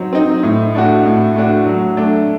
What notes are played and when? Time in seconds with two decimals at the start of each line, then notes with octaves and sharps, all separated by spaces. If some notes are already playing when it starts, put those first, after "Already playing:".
Already playing: F#3 C4 D#4
0.13 C4 D#4
0.43 A2
0.75 A3 D4 F#4
1.06 A2
1.36 A3 D4 F#4
1.66 F#3
1.97 A3 D4